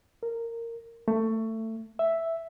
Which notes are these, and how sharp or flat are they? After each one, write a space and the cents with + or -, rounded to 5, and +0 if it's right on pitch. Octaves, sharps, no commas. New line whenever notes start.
A#4 -15
A3 +20
E5 +0